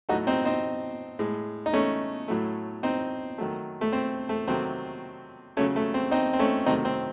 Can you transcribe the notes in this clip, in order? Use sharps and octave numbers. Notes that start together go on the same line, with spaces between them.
A2 F#3 A3 D#4 F#4
C4 D#4
C4 D#4
A2 G#3
D#4
A3 C#4
A2 F#3 A3
C4 D#4
D#3 F#3 A3
A3
C4
A3
C3 D#3 F#3 A3 C4
C#3 F#3 A3 C#4
A3
C4
C4 D#4
C4
A3 C#4
C3 D#3 F#3 A3 C4 D#4
C4